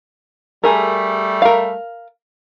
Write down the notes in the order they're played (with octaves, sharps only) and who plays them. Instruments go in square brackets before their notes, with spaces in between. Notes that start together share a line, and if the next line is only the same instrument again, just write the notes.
[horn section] G3 A3 [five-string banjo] G#4 A#4
[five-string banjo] A#4 F5